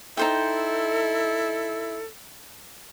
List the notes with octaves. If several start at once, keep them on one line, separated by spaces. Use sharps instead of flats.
D#4 E4 A4 C5 G5